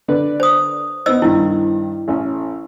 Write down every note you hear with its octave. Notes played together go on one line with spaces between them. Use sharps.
D3 B4 D5
C5 D#6
B3 D#4 C5 D#5 E6
G2 D#3 E4
A1 C#4